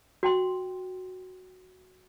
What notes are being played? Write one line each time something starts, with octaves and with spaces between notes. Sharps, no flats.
F#4 G5 C6